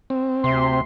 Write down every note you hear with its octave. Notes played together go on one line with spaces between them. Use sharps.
C4
D2 C3 E5 C6